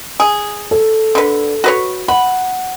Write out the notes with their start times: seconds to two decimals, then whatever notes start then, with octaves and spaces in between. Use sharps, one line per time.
0.20 G#4
0.71 A4
1.15 D3 B4
1.64 F#4 B4 C#5
2.08 F#5 B5